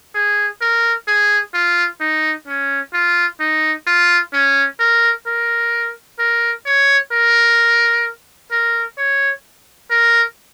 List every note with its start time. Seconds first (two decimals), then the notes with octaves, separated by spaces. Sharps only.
0.15 G#4
0.61 A#4
1.08 G#4
1.54 F4
2.00 D#4
2.47 C#4
2.94 F4
3.40 D#4
3.87 F4
4.33 C#4
4.79 A#4
5.26 A#4
6.19 A#4
6.65 C#5
7.12 A#4
8.51 A#4
8.98 C#5
9.90 A#4